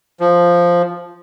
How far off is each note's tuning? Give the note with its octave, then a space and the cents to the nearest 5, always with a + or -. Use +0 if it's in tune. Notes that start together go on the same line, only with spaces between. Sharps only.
F3 +0